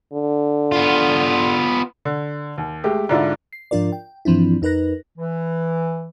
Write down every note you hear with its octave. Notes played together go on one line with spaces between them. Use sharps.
D3
B3 F4
D3
D#2
G#3 A3 G4
G#2 D3 D4 E4 F4
C7
G#2 F3 D4 F4 A#4 D5
G5
G2 E3 F3 C4 D4 E4
F2 D#4 A#4 B4 F#6 A#6
E3